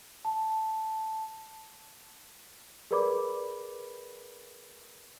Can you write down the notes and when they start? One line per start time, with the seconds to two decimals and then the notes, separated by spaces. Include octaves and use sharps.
0.25 A5
2.91 G#4 A#4 B4 D5 B5 D6